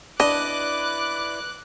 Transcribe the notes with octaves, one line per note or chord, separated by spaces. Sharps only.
D4 E4 B4 D5 D#5 D6 F#6